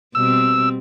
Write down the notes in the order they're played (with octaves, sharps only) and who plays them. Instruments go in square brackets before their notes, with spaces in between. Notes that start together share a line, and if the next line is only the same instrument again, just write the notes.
[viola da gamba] B2 G3 C4 [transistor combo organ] E6